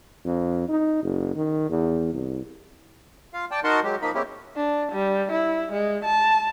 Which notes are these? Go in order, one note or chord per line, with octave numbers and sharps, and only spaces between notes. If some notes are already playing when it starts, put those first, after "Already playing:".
F2
D#4
F#1
D#3
E2
C2
F4 F5
D5 G5 A5
D#4 F#4 A#4 F#5 A5 C6
F#3 G#3 G4
F3 A#3 D#4 B5
G#3 A#3 C4 C#4 E4 G4
D4
G3
E4
G#3
A5